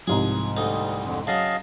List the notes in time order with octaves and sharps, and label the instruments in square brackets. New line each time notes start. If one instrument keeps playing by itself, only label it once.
[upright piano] C2 G#2 F3 [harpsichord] G#4
[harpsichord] D2 D#4 F5 [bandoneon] G3
[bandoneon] F2 D3
[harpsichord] C#3 F#3 [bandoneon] D#5 F5 A5